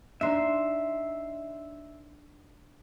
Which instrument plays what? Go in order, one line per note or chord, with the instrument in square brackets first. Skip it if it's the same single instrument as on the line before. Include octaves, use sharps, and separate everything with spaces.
[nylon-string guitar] D4 D#4 [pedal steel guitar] E5 C6